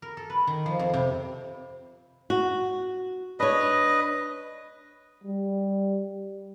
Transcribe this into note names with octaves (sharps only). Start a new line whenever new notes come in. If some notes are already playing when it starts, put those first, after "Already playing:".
A#4
A4
B4
D#3
F3
F2
C3
F#4
D4 B4 C#5 D#5
G3